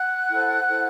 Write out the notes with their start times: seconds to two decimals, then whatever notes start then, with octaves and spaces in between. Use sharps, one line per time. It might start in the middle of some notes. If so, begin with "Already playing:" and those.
Already playing: F#5 F#6
0.29 E4 A4 C5
0.68 E4 A4 C5